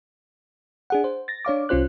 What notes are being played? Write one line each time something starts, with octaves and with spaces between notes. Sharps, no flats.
D4 G#4 F#5
C5
A6 A#6
D4 C#5 F5 D6
C2 C#4 F4 C5 F#6